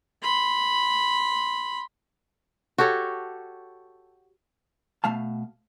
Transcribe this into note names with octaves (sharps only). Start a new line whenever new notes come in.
B5 C6
F#4 G4 A4 C#5
B2 A3 F5 A5